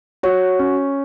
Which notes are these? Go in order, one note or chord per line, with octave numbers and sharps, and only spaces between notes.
F#4 C#5
C#4